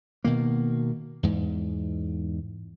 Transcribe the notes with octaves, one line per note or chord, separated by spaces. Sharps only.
B2 D#3 A#3
E2 G#2